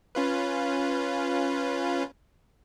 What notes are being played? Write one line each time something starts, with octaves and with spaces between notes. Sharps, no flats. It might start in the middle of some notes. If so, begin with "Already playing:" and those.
C#4 F4 B4